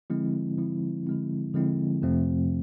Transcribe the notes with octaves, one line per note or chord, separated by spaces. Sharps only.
D3 F3 G#3 C4 E4
D3 F3 G#3 C4 E4
D3 F3 G#3 C4 E4
D3 F3 G#3 C4 E4
F2 C3 F3 A3 C4